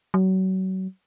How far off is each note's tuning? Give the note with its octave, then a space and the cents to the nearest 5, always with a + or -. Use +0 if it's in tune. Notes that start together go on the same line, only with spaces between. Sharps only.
F#3 +30